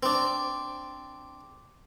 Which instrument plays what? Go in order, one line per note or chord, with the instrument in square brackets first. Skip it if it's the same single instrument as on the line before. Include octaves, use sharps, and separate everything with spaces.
[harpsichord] C4 D4